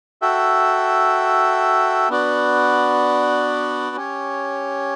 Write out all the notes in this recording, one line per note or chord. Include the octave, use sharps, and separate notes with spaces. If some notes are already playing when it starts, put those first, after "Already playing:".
F#4 A4 E5 G5
B3 D4 F#4 B4 D5
C#4 G4 C#5